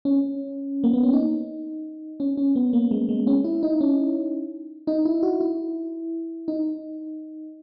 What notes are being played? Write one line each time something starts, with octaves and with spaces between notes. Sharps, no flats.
C#4
A#3
B3
C#4
D#4
C#4
C#4
B3
A#3
G#3
G#3
C#4
E4
D#4
C#4
D#4
E4
F#4
E4
D#4